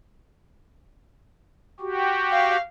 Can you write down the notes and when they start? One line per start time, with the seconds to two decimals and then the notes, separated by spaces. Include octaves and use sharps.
1.80 F#4 G4
2.32 F5